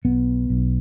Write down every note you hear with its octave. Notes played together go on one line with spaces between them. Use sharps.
B1 B3
B1